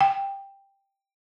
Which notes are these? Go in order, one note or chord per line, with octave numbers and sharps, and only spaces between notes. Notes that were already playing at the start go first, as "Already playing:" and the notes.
G5